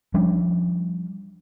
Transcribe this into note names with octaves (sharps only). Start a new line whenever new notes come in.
F3 G3 C#4 D4